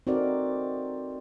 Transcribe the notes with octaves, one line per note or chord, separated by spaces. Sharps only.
C4 D#4 F#4 A4 A#4 D5